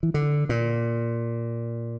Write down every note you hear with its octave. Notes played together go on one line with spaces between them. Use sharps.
E3
D3
A#2